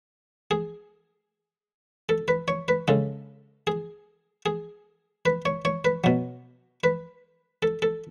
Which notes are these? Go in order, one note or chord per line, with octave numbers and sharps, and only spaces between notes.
G#4
A4
B4
C#5
B4
C#3 G#3 A4
G#4
G#4
B4
C#5
C#5
B4
B2 F#3
B4
A4
A4